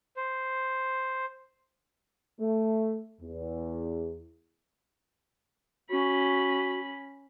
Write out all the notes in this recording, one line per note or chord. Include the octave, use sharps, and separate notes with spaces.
C5
A3
E2
C#4 F#4 B5